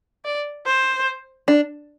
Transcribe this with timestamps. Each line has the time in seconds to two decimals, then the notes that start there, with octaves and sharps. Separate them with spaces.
0.25 D5
0.66 C5
1.48 D4